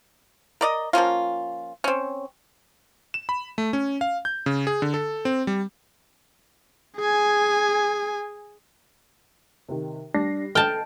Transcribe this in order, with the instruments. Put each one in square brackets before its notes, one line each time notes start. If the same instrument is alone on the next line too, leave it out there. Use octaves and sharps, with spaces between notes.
[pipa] A#4 D5 D#5
F3 A#3 C#4 F4
C4 C#4
[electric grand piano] E7
B5
A3
C#4
F5
G6
C#3
G#4
D3
A4
C4
G3
[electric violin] G#4 G#5
[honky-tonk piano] C3 D#3
[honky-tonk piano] G3 A#6 C7 [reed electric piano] D4
[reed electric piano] A4 [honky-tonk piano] D#5 [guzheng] G5 A5 [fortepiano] F6